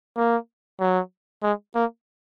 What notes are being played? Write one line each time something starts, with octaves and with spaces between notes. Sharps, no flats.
A#3
F#3
G#3
A#3